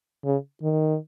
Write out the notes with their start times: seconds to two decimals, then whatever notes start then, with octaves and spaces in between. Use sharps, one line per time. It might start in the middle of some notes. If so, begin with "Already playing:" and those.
0.25 C#3
0.63 D#3